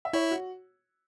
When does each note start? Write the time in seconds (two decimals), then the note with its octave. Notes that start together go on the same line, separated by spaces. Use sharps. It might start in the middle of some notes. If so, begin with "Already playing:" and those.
0.05 E5
0.13 E4 C#5
0.31 F#4